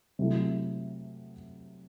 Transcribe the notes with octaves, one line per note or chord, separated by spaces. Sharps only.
C3 F#3 A3 E4